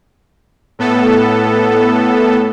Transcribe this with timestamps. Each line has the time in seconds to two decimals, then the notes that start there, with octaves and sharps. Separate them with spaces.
0.79 A2 B3 A4